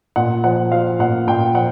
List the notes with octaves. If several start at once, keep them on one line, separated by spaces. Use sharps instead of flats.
A#2 F#5
F3 F#5
F3 F5
A#2 F#5
A#2 G5
F3 F#5